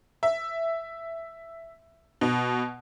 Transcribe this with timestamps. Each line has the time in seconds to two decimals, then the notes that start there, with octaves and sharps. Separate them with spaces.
0.23 E5
2.21 B2